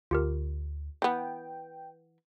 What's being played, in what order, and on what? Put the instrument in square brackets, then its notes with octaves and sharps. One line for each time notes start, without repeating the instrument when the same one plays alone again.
[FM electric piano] D2 [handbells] F4 G4 A#4
[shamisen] E3 B3 [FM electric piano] G5